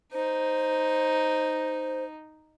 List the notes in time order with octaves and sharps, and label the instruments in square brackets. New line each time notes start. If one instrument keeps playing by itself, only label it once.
[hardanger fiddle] D#4 [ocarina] C5